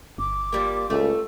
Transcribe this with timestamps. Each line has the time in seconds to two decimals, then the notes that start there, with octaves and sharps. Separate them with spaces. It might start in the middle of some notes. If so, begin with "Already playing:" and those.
0.18 G1 D6
0.52 F3 G3 A#3
0.90 C#2 A3